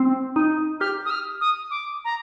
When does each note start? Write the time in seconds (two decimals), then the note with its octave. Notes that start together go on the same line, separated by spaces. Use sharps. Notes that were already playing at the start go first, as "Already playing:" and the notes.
Already playing: C4
0.36 D#4
0.80 G4 F6
1.05 D#6
1.10 F6
1.41 D#6
1.71 D6
2.05 A#5